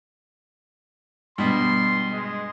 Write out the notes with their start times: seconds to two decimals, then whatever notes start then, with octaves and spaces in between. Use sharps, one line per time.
1.38 G2 B2 C6
2.12 G#3